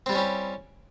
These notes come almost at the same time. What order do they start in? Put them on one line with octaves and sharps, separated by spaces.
C4 G3 E4 C#4 G4